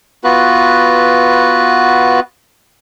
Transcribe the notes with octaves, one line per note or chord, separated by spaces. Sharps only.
B3 F4 F#4 B4